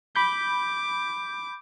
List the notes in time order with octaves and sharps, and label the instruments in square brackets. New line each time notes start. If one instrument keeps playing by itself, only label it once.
[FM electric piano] B5 G6 [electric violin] D6